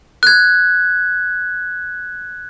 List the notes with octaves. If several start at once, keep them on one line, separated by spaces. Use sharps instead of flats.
F#6 G#6